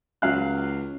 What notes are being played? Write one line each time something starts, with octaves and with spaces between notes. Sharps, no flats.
C#2 F#3 F5 F#6